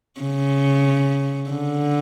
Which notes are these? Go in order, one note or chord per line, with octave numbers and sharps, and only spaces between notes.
C#3
D3